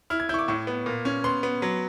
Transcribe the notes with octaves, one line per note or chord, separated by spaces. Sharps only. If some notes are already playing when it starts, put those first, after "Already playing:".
E4 F6
G#6
E4 C#6 G6
D6
A2 C#6
B3
A#2
C#4
B3 C6
B3
F#3